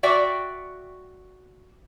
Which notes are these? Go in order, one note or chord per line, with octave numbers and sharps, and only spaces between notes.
F#4 D5 E5 G5